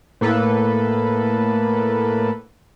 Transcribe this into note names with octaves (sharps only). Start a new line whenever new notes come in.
A2 A#3 A4 B4